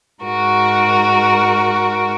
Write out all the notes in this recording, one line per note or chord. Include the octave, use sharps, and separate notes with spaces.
G#2 F#4 A#4